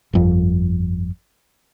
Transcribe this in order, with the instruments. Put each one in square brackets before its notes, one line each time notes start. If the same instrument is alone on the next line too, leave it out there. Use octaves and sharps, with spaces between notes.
[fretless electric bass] G1 F2